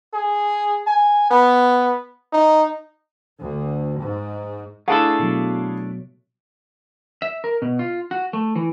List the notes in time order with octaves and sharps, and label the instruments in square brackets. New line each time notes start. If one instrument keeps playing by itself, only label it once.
[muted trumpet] G#4
G#5
B3
D#4
[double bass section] D2
G#2
[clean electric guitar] A3 D4 A4 [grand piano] E4 G#4 F5
[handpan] B2 F#3
[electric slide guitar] E5
A#4
B2
F4
F#4
A3
E3